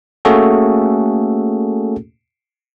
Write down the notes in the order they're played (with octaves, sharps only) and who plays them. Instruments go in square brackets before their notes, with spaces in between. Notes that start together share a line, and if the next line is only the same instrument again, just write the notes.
[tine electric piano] A3 A#3 C#4 F#4 G#4 A4